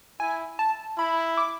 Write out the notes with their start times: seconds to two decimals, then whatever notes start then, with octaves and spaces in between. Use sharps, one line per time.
0.20 E4 G#5
0.59 A5
0.98 E4 B5
1.37 D6